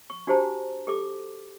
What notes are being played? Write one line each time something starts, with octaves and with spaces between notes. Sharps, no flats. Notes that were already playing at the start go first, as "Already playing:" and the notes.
C#6
D4 F#4 G4 C5 A5 A#5
G4 A4 D6